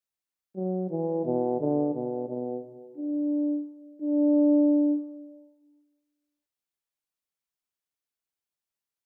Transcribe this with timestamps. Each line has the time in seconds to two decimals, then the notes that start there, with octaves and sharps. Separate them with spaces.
0.56 F#3
0.91 E3
1.26 B2
1.60 D3
1.95 B2
2.29 B2
2.97 D4
4.02 D4